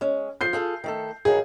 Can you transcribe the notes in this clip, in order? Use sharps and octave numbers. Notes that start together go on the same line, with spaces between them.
G#3 C#4
F3 G6 C7
F4 G#4 A4
D#3 A3 A4
G2 D#3 F#3 G#4